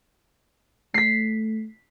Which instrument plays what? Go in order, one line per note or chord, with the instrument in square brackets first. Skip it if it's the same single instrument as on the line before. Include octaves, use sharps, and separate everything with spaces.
[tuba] A3 [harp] B6 C7